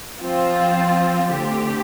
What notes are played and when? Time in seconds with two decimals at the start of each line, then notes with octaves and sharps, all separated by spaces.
0.18 F3 C4 F4
1.31 D3 A3 C4 G4